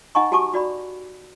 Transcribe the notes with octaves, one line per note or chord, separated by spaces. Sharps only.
D#4 D#5 F#5 G#5 A#5 C#6
F#4 G4 G#5 A5 C#6 D6
F#4 D5 B5